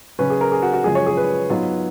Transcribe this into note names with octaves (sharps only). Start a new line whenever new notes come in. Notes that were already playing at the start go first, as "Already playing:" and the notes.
C#3 F#3 C#4 B4
G#4
A#4
G#4
F#4
F#4
F#2 C#3 F3 G#3 G#4
C#5
G#4
B4
G#2 F#3 B3 F4